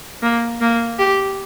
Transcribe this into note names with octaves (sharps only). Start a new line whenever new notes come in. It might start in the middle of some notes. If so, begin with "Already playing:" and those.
A#3
A#3
G4